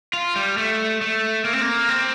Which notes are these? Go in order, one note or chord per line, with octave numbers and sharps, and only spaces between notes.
F4
G3
A3
A3
A#3
C4
A#3
C4